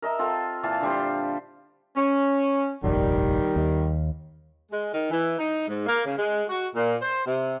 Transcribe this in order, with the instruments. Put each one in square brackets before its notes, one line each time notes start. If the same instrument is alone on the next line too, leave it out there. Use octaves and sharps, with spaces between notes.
[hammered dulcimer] A#4 D#5 E5 A#5
C4 F4 A4
A#2 E3 F5 A5
D3 G3 C5
[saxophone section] C#4
[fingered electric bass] F1 A#1 D#2 [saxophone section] D#3 G3
[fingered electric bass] D#2
[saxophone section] G#3
D#3
E3
D#4
G#2
A#3
C#3
G#3
F#4
A#2
C5
C3